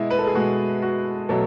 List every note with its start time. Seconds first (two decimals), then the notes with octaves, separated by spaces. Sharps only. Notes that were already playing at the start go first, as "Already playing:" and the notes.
Already playing: B2 G#3 E4 D#5
0.10 B4
0.19 A4
0.27 G#4
0.34 B2 G#3 F#4
0.82 F#4
1.29 B2 F#3 A3 A4